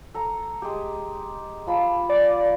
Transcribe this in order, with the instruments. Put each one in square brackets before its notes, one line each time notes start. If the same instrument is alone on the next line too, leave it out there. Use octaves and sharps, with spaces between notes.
[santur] A4 A#5
G#3 G4
F3 A5 B5
[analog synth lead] D5